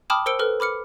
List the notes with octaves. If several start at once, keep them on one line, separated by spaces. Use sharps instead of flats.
G5 A5 B5 D6 D#6 F6
A#4 C5 E6 C#7 D7 G7
A4 B4 F6
B5 D6 F6 C#7